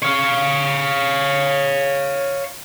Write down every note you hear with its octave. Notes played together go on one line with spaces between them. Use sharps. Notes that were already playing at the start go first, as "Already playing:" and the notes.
C#5 F5